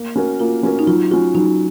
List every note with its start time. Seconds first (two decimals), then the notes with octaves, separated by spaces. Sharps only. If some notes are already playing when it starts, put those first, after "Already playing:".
Already playing: A#3
0.16 C#4 F#4 A#4
0.40 A#3 F4
0.63 C#4 F#4 A#4
0.79 D#4
0.87 F#3 F4
1.11 C#4 F4 F#4
1.35 F#3 D#4